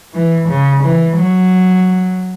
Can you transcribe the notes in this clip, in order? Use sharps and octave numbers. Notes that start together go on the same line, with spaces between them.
E3
C#3
E3
F#3